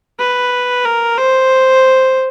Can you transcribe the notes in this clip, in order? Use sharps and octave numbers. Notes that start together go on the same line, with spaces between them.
B4
A#4
C5